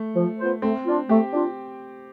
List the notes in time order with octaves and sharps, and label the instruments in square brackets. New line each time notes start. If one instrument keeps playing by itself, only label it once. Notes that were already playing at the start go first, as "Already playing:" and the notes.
Already playing: [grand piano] A3
[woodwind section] F3
B3 F4 C5
[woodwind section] A3 [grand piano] C4
[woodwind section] D4 F4
[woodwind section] A3 [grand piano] G4
[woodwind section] D4 F4